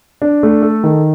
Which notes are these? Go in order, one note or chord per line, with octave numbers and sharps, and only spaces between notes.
D4
A3
A4
D#3